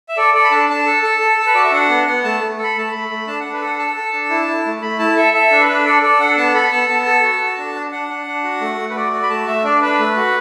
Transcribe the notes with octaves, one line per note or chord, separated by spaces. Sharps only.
E5
A4 D5
A4 D5
B5
D4 A5
D4 A5
A4
A4
A4
A4
B4
F#4 D5
E5
D4 F#5
B3
B3
A3 A5
A3
A4
B5
A3 A5
A3 B5
A3
D4 A5
D4 F#5
B4
A4 F#5
A4 A5
A4
D4
E4
E4
A3
A3 B5
E4 A5
A4 E5
A4 E5
D4
B4
D4
A4 D5
A4 D5
D4 F#5
B3 A5
A4 B5
B3 A5
B3 A5
A4
F#4
F#4
D4
D4
D4 F#5
D4
D4
F#4
A3
A3
B4
F#4 D5
F#4 D5
B5
A3 A5
A3 E5
D4 D5
D4 B4
A3
F#4